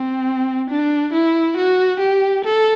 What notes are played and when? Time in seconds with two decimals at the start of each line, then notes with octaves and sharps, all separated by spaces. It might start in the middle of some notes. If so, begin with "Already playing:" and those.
Already playing: C4
0.70 D4
1.13 E4
1.57 F#4
2.00 G4
2.44 A4